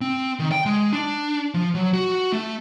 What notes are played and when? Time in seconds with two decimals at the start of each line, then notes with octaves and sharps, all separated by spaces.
0.01 C4
0.39 D#3
0.52 G5
0.66 G#3
0.93 D4
1.54 F3
1.75 F#3
1.93 F#4
2.32 A3